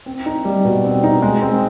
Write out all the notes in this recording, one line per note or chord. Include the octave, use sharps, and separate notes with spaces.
C4
D#4
G3
B2
C4
D#4
G#3
C4